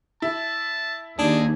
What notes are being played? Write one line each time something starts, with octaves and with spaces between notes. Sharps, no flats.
E4 A5
D#2 D4 G#4